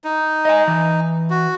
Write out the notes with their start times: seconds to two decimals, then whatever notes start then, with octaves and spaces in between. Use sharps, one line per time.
0.04 D#4
0.45 D#5 G#5
0.68 E3
1.30 F#4